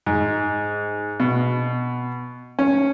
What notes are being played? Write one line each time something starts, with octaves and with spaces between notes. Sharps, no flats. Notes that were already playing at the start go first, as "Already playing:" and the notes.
G#2
B2
C#4